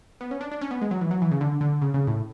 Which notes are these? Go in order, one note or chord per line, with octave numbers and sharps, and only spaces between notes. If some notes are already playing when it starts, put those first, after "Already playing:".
B3
C#4
D4
D4
C#4
B3
G#3
F#3
E3
F#3
E3
C#3
D3
D3
C#3
C#3
A2